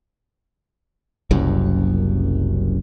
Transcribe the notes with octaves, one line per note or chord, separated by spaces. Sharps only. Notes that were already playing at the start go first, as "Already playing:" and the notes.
F#1 C2 F#2